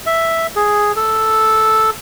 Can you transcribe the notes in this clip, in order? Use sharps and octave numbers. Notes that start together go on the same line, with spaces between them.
E5
G#4
A4